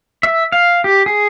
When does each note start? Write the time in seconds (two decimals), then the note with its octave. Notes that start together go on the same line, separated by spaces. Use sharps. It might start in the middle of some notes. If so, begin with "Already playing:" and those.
0.23 E5
0.52 F5
0.84 G4
1.06 G#4